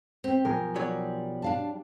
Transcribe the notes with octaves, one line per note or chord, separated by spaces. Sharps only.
C4 G4
B1 F3 A#4 G#5
F#3 G3 C#5
D4 F5 A5